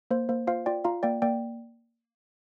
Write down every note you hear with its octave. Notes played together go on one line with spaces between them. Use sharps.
A#3 C5
A#3 C5
F4 C5 F5
F4 D5 G5
F4 F5 A#5
A#3 D5 G5
A#3 D5 G5